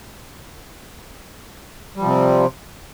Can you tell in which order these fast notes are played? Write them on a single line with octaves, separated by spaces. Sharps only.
G3 F3 C3 C4